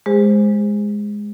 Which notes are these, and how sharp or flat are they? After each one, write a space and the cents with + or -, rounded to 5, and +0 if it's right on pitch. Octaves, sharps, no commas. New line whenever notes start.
G#3 +0 G#4 -45 C5 +0